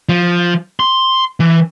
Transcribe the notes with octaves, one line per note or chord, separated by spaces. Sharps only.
F3
C6
E3